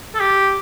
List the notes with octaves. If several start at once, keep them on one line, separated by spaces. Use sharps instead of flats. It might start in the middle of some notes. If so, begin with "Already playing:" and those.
A4
G4